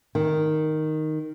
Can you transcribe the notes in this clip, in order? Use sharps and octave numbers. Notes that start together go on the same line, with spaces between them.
D#3